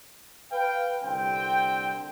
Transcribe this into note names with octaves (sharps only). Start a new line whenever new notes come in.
B4 F5 G5
C2 D3 C4 G5